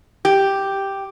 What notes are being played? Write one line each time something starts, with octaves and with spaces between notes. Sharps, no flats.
G4